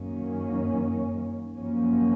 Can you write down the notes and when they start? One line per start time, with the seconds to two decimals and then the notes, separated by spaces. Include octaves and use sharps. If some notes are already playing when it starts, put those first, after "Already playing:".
Already playing: F#2 D#3 A#3 C#4
1.55 F#2 F3 A#3 C#4